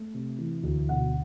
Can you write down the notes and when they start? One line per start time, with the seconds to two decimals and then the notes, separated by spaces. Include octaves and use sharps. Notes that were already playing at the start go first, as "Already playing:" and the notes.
Already playing: A3
0.14 C3
0.38 E3
0.63 D2
0.89 B2 F#5